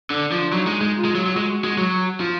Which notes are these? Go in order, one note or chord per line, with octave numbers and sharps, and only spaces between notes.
D3 D4
F3
F#3 D#4
G#3
G#3
F4
G#3
F#3
F#3
G#3 F#4
G#3
F#3
F3